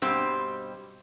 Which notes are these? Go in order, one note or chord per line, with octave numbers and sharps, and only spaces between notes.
G2 B2 G3 C4 G4 C5